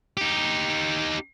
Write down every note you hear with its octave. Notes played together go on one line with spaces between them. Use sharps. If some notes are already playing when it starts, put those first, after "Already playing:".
D#4 G4